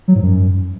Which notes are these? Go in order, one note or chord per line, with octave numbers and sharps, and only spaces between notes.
F#3
G#2
F#2